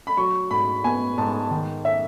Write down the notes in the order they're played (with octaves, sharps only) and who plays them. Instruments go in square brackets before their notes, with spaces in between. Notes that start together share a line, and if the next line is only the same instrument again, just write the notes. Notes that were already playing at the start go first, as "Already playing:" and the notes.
[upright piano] B5
[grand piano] F#3 [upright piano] C#6
[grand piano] G#2 [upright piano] B5
[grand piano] B3 [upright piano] G#5
[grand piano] G#2 [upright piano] A5
[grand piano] D#3
[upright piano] E5